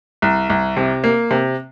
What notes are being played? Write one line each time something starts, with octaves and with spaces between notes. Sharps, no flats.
C2
C2
C3
A#3
C3